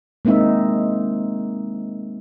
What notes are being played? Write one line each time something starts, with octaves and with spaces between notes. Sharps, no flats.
G#3 A#3 C4 D#4 E5